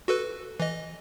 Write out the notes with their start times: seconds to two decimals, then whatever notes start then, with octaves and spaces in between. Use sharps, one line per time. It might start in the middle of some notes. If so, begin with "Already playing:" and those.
0.08 F#4 A4 B4
0.60 E3 D#5